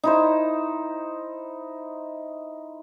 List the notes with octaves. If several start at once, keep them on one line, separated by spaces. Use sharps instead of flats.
D#4 E4 C5